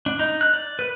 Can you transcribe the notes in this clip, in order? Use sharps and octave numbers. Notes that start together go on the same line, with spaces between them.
D4
D#4
F#6
D5
B4